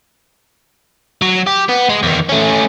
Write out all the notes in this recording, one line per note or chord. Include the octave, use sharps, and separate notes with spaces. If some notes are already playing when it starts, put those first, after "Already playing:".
F#3
G4
B3
G#3
E2 D#3
A3 C#4